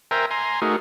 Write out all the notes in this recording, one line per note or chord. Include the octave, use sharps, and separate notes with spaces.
A#4 C5 E5 G5 G#5 A#5
G#5 A#5 C6
A3 D#4 F#4 G#4 A#4